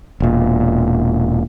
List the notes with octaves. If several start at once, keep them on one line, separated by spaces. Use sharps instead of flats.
E1 A#2